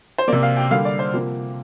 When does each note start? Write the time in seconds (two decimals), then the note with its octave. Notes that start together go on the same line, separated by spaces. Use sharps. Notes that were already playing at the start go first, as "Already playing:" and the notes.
0.18 C5
0.28 C3 A#3 D5
0.43 F5
0.57 G5
0.71 D3 G3 A#3 F5
0.85 D5
0.99 C5
1.14 C3 F3 A#3